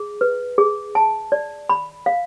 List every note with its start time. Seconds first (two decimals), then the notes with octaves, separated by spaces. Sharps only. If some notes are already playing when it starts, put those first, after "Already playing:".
Already playing: G#4
0.21 B4
0.58 G#4
0.95 A5
1.32 D5
1.69 B5
2.06 F5